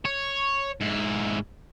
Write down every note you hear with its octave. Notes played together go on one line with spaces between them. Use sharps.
C#5
G#2 E4